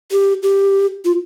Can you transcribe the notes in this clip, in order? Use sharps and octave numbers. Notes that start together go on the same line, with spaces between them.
G4
G4
F4